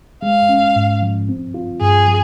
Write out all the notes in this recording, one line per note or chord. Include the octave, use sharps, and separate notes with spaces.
G#3 F5
C#4
G#2
F3
C4
F4
G2 G#4
F3